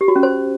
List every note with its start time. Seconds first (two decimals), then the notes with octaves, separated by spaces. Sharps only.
0.01 G4
0.08 F#4
0.16 C#4
0.23 C5